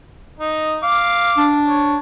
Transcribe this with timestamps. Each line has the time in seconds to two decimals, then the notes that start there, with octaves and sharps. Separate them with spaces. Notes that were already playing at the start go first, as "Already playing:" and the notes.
0.39 D#4
0.83 F5 D6
1.37 D4
1.66 C#5